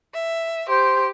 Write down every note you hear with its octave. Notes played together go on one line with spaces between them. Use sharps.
E5
G4 C5